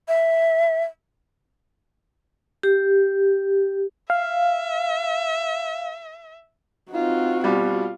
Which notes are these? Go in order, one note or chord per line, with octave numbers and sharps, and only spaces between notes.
E5
G4
E5 F5
C4 D#4 F4 F#4
B2 G3 F4